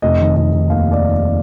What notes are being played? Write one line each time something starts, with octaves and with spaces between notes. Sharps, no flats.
F1 D#5
D#3
F1 D#5
D#3
D#2 F5
D5